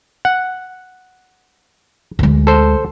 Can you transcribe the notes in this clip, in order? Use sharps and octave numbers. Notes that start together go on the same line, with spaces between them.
F#5
D2 G#3
A4 C5